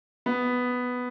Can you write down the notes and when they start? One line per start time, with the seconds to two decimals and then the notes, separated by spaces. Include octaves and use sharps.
0.26 B3